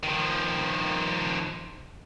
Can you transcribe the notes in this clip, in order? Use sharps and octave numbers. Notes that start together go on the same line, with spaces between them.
D#3 F3